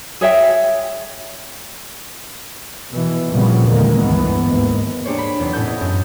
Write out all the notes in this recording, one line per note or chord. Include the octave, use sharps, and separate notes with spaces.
G#4 C#5 E5 G5
B2 E3
F2 A#2 C#3 F3 G3 B3
E2 D3 D#3 G#3 A#3
G1 C#2 G2 E3 B3
D#2 G#2
A#3 D4 G4 G#4 C5 C#5
B5 B6
E2 F#3 B3 C4 D#4
A2 B3 C#4 E4 A4 G6
D#5
F#2